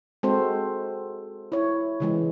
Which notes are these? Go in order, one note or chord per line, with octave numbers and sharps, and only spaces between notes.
G#3 C4 F#4 A4 C5
E4 C#5
C#3 E3 G#3